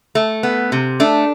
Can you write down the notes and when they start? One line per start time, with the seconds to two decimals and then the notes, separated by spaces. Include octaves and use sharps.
0.15 A3
0.43 B3
0.72 C3
1.00 A3 D4